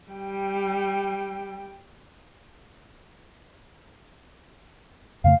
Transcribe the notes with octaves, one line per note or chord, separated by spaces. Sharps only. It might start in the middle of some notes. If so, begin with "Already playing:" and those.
G3 G5
F2 C#3 A3 F5